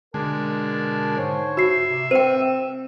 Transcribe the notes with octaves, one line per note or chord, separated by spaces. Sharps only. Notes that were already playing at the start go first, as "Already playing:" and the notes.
B2 D3 G#3 A#4 A5
G#2 C5 C#5
F#4 E5 C7
C3
C4 C5 G5 D#7